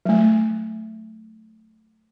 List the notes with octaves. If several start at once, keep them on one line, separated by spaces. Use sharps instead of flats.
F#3 A3